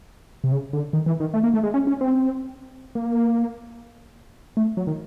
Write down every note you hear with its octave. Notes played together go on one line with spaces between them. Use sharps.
C3
C#3
D3
D#3
E3
D#3
A3
A#3
A3
G#3
C#4
C#4
C4
A#3
A3
F#3
D#3